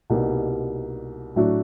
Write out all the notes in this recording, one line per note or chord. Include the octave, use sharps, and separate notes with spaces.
C2 B2 G3 A#3 D#4
A2 F#3 A3 D4 F#4